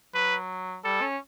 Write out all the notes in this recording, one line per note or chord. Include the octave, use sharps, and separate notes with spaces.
F#3 B4
G3 A4
C#4